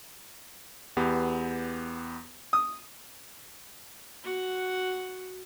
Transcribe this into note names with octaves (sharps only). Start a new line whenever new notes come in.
E2 B3 G4
D#6
F#4 F#5